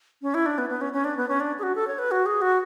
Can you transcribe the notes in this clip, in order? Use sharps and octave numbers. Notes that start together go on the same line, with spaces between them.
C#4
E4
D4
B3
B3
C#4
C#4
D4
B3
C#4
D4
G#4
F#4
A4
C#5
B4
F#4
G#4
F#4